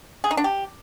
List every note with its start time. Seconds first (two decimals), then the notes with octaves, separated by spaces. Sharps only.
0.24 G#4
0.31 D#4
0.37 D4
0.44 G4